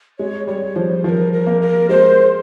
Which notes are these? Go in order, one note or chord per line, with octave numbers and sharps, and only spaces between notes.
G#3 C#5
G3 C#5
F3 C5
F3 A#4 C5
A#4
A#3
A#4
G#3 C5